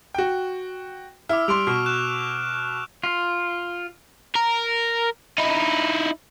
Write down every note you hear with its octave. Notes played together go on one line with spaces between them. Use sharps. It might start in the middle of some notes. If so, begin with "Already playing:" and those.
F#4 G5
E4 D6 E6 F6
G3 C6 D7 F7
B2 C#6 F6
F#6 E7
F4
A#4
D#4 E4